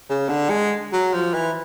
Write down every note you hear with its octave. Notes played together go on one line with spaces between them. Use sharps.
C#3
D3
G#3
F#3
F3
E3